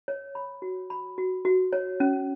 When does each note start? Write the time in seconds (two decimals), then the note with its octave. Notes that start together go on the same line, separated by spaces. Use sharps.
0.08 C#5
0.35 B5
0.62 F#4
0.90 B5
1.18 F#4
1.45 F#4
1.73 C#5
2.00 C#4